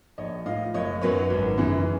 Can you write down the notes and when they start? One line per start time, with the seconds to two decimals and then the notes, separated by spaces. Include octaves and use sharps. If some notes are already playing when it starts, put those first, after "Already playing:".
0.18 A#1 C#5 D#5
0.45 A2 F3 D#5 F5
0.74 F#1 C#5 D#5
1.02 F#2 D#3 F#3 B4 C#5
1.30 G#1
1.58 F#2 C#3 E3